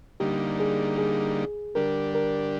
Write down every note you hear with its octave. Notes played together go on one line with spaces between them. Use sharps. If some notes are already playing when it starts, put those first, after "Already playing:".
D3 G3 A#3 D#4 G4
G#4
G#4
D3 G3 D4 G4 A#4
A#4